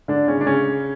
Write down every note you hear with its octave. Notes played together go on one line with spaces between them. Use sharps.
D3 D4
C#3 C#4
D4
C#3 C#4